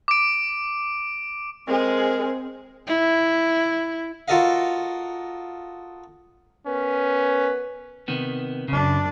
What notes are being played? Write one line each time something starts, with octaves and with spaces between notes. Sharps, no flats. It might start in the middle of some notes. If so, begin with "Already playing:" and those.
D6 D7
G#3 C4 G#4 A#4
E4
F4 F#4 A4 A#4 D#5 F5
B3 C#4 A#4 B4
C3 D#3 B3
F#2 C#3 D4